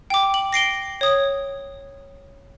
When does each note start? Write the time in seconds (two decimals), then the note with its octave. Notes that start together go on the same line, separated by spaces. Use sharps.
0.10 G5 D6
0.34 F#7
0.53 A#6 C7 D7 G7
1.01 C#5 D#6